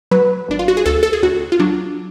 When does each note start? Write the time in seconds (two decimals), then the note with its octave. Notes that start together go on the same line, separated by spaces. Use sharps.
0.11 F#3 B4
0.48 G#1 D4
0.59 F4
0.68 F#4
0.77 G#4
0.86 D2 A4
1.03 A4
1.13 G#4
1.23 D2 F#4
1.52 F4
1.59 F#3 D4